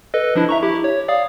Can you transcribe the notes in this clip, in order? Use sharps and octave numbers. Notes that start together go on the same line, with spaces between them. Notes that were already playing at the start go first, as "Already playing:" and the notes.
A4 B4 D#5
F3 D4 E4
E5 A#5 C#6
E4 G4
C#5
D5 F5 D#6